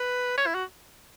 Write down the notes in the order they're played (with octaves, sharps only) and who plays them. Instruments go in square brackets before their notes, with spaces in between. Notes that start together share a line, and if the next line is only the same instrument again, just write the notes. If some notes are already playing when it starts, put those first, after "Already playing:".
Already playing: [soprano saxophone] B4
C#5
E4
F#4